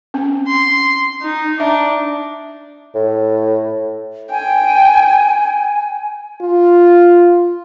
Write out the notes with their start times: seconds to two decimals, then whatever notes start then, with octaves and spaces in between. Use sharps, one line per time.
0.14 C4 C#4
0.47 C6
1.22 D#4
1.60 D4 E5 A#5
2.95 A2
4.31 G5 G#5
6.41 F4